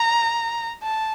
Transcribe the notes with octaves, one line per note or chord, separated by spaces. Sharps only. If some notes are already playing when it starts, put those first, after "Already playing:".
Already playing: A#5
A5